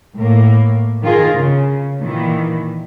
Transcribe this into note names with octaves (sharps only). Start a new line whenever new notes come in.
A2 A#3
D#3 F4 G#4 A#4
C#3
A#2 D#3 E3